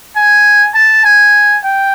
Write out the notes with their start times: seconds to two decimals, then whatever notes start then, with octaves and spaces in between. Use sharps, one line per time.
0.16 G#5
0.75 A5
1.05 G#5
1.64 G5